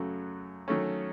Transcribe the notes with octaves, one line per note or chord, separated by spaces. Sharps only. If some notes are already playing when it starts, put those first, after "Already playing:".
Already playing: F#2 C#3 F#3 A3
D#3 F#3 A3 C#4